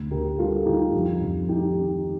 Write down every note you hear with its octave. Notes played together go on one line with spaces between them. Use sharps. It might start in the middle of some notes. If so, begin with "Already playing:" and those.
Already playing: D2
D3 G4 A#4
G3 F4 A4
D3 D#4 G4
F2
F2
D#3 D#4 G4
D#3